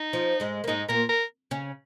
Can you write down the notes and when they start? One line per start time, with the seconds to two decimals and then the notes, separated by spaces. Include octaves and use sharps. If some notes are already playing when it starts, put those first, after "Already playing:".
Already playing: D#4
0.13 F3
0.40 G#2 G#3
0.64 A#3
0.68 G#2 G#3 D#4
0.88 A#2 A#3 A#4
1.09 A#4
1.51 C#3 C#4